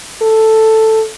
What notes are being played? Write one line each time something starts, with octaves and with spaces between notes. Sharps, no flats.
A4